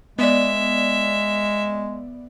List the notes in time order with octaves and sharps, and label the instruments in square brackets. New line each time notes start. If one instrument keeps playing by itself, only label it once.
[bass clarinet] G#3 [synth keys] B3 D5 [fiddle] E5